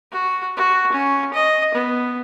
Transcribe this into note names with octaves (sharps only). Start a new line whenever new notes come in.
F#4
F#4
C#4
D#5
B3